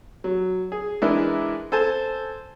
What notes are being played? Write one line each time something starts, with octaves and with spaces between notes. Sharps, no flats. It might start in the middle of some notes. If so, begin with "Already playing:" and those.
F#3
G#4
E3 G#3 D4 E4 A#4
A4 C5 G#5 A5